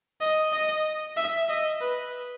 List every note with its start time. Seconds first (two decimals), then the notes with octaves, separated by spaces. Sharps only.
0.21 D#5
0.53 D#5
1.17 E5
1.49 D#5
1.81 B4